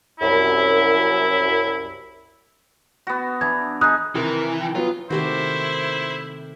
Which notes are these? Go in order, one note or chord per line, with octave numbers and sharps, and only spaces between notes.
C2 F#2 E4
B3 F#4
E3 D4 G#6
D#4 G#4 D#6 F#6
C3 D#3 E3 A#4
G5
F#3 B3 F4
C3 D#3 A3 E4 F#4 G4 C5